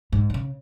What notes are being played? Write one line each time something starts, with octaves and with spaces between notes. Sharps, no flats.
G#2
D#3
C#3